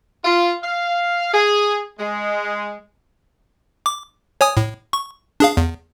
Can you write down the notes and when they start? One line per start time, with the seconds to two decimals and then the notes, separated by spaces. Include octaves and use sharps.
0.24 F4
0.63 F5
1.33 G#4
1.99 G#3
3.86 D6
4.41 C#5 G#5 D#6
4.57 A2
4.93 C#6
5.40 D4 G#4 F5
5.57 E2